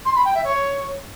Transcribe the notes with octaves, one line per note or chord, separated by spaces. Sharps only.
C6
B5
G5
E5
C#5